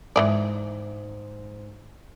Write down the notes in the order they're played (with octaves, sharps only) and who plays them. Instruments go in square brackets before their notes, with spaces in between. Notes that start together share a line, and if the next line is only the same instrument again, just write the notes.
[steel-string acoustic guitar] G#2 [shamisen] E3 A3 D5